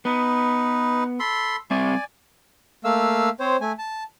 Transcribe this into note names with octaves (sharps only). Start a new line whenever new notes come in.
B3 D#4 B4
A4 B5 C6
G3 C4 D5 E5 G#5
A3 A#3 F5 E6
C4 C5 C#5
A3 G#5
A5